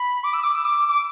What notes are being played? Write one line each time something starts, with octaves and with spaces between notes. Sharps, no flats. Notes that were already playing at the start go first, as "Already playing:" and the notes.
Already playing: B5
D6
E6
D6
E6
D6
D6